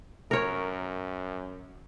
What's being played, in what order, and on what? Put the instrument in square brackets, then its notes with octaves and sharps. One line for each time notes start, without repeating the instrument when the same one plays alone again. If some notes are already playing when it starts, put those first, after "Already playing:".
[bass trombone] F#2 [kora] A#4 C#5